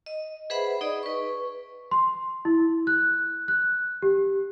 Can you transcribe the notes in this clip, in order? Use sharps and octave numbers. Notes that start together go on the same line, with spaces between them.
D#5
G#4 B4 C5 E5 F#5 B5
D#4 G#4 D5 D#5
B4 C#6
C6
E4
F#6
F#6
G4